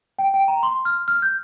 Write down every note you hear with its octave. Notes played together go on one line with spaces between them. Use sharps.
G5
G5
A#5
C6
F6
F6
G6